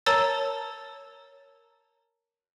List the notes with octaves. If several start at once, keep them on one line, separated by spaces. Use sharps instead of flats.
A#4 C#5 A5 A#5 E6 A6